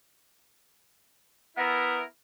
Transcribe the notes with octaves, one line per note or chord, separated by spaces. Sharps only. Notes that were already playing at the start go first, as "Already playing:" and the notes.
B3 E4 A#4